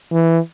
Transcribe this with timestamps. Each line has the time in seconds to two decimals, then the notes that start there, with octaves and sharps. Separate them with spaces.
0.12 E3